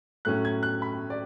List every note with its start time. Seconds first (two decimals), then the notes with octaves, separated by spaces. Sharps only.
0.25 A2 F#3 A3 C#4 F#6
0.45 G#6
0.63 F#6
0.82 B5
1.10 D5